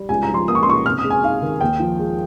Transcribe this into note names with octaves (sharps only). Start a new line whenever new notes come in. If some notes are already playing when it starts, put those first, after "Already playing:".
Already playing: G3
C#2 G#5
A#5
F3
C6
A#3 D#6
C#6
C6
C#3 C#6
C3 F6
D#6
G#3
G#5
D#4 F5
D#3
D#2 G5
F3
G#3